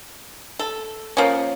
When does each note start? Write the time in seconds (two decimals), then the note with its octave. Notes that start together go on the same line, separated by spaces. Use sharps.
0.59 A4
1.17 F3 A#3 C#4